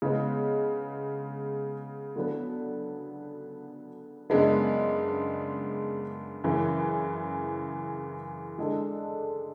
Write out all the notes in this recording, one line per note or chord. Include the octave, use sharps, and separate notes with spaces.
C#3 G#3 B3
D3 F#3 B3
F#2 C#3 G#3 B3 D4
F#2 C#3 E3
D3 G#3 D4 A4